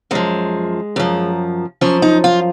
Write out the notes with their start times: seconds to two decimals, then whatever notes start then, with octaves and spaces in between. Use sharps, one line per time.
0.11 F#2 F3 G#3
0.96 F#2 F3
1.81 F#2 F3 C#4
2.02 D#4
2.24 F4